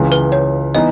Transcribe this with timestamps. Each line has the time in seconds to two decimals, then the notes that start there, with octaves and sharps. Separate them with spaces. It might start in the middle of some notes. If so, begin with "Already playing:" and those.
Already playing: C#2 C#3 E3
0.12 B4
0.32 C#5
0.75 E3 B3 D#4 D#5